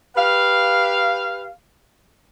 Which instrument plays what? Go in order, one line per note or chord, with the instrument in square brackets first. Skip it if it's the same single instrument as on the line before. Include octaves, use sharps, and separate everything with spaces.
[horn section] G4 B4 F5